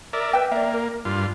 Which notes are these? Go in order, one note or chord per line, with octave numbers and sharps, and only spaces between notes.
A#4 D5 E5
B4 E5 G5
A#3 D5 E5
A#4
G2 F4